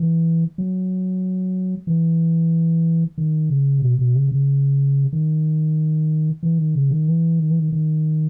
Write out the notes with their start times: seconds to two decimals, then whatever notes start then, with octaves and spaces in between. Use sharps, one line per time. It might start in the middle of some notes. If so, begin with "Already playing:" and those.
Already playing: E3
0.58 F#3
1.87 E3
3.18 D#3
3.49 C#3
3.82 B2
3.99 B2
4.15 C#3
4.31 C#3
5.13 D#3
6.43 E3
6.58 D#3
6.75 C#3
6.91 D#3
7.08 E3
7.39 D#3
7.50 E3
7.59 D#3
7.72 D#3